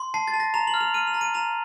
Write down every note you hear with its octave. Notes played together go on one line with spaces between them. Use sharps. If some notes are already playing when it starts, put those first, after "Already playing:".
Already playing: C6
A5 C7
A6
A5
A#6
A#5 F7
F#7
F6
F7
F6 D#7
F7
A#5
D#7
A#5 F7